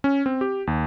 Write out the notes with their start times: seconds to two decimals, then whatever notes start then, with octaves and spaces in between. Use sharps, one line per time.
0.04 C#4
0.26 C4
0.41 G4
0.67 D#2